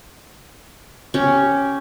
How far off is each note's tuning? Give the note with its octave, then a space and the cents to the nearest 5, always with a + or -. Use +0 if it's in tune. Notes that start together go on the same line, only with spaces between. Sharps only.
C#4 +0 G4 -10